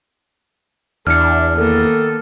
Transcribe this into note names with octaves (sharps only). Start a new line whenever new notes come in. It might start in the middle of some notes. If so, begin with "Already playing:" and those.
E2 D4 F6 C#7
D#3 A#3 B3 A4